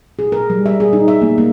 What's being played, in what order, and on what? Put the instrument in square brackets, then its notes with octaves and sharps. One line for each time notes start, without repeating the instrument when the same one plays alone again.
[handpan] G#4
A#4
G3
E5
G#4
D#4
E5
A#3
A#3